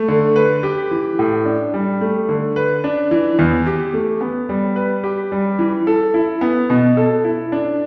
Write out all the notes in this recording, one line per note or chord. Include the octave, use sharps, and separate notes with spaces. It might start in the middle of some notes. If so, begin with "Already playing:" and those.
Already playing: A3
D3
B4
G4
E3
A2
D4
G3
A3
D3
B4
D4
E3
E2
G4
A3
B3
G3
B4
G4
G3
E3
A4
E4
B3
B2
A4
E4
D4